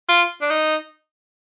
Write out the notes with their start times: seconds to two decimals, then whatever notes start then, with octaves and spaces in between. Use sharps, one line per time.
0.09 F4
0.42 D4
0.51 D#4